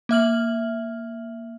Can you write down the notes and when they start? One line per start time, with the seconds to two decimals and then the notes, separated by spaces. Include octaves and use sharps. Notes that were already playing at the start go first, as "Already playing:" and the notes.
0.09 A#3 E5 F6 F#7